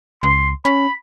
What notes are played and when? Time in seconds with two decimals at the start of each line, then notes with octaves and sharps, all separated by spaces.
0.23 C#2 C6
0.65 C#4 B5